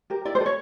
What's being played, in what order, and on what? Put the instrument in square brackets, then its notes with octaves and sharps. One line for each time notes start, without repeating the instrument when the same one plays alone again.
[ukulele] G4 A#4
E4 D5
C5
A4
C#5